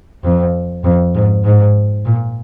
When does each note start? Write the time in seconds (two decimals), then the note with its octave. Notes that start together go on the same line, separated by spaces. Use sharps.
0.24 F2
0.84 F2
1.15 G#2
1.44 G#2
2.05 A#2